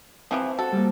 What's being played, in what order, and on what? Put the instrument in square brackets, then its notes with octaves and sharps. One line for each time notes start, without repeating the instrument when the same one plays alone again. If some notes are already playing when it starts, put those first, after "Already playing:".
[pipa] C3 E3 F3 [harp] C4
[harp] F#4 [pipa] A4
[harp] G3 A#3